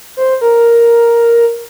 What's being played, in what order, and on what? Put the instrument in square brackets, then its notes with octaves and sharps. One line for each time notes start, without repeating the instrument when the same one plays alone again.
[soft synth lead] C5
A#4